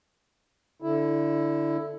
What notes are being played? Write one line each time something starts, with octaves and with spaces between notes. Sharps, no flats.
D3 E4